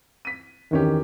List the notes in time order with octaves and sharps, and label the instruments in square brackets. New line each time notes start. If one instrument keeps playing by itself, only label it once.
[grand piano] B6 D#7
[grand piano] E2 C#4 G4 [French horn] D#3